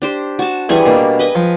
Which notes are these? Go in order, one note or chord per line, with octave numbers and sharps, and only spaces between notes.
D4 G4 C5
F#4 A5
E2 E3 G3 G#4
B2 A#3 D4
B4 D#5 G#5
F3